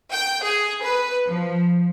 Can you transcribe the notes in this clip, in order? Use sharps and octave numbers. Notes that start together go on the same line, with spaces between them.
G5
G#4
B4
F3